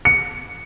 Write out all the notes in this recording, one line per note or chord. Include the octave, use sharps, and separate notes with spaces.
C#7